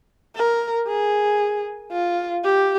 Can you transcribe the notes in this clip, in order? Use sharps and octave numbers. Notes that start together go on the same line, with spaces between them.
A#4
G#4
F4
G4